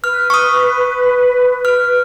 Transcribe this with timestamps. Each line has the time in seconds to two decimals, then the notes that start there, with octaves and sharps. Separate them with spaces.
0.04 B4 F6
0.30 C#6 D#6
1.65 F6